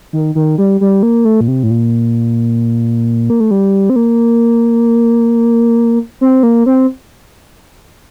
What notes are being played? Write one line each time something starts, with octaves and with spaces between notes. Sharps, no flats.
D#3
D#3
G3
G3
A#3
A3
A#2
C3
A2
A#2
A#3
A3
G3
C4
A#3
C4
A#3
C4